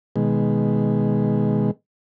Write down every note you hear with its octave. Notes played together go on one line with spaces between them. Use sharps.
B2 D#3 G#3